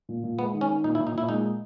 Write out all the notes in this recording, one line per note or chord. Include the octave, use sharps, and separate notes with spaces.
A#2
A#2
G#3 B3
D#3
C#4
D#3
A#2 D#4
E4
A#2
D#4
A#2 E4
G#3 D#4